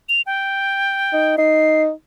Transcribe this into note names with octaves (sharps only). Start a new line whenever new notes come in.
F7
G5
D#4
D#4 C7